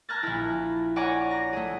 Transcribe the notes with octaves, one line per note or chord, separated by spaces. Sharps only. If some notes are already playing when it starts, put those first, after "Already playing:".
A5 A#5 F6 F#6 G#6 A6
A#1 E4
C#5 D5 F#5 G#5 A#5 D6
A#6
A3 G#4